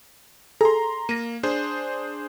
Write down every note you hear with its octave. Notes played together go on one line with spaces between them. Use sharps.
G#4 A4 A#5 C6
A#3 A#6 D#7
D4 G#4 C5